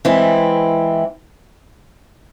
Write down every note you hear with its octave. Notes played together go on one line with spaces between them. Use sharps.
E3 G#3 C4 E4